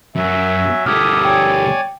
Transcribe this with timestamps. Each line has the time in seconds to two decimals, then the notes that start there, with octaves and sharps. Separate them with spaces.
0.16 F#2 F#3 E5 G#5
0.86 D2 G3 G4 A4 D6 D#6 F6 G#6
1.25 C#5 D5 G5 G#5